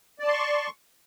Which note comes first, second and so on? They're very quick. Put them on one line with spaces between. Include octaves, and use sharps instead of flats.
D5 A5 C6 C#6